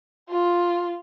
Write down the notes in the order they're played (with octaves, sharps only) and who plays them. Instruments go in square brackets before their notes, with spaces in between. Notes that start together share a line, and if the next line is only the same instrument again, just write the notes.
[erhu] F4